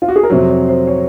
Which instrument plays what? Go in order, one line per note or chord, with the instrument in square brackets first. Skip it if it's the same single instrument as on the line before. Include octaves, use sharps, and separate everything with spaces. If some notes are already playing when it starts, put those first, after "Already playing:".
[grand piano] F4
F#4
G#4
A#4
F2 C3 F#3 C5
C#5
C5
C#5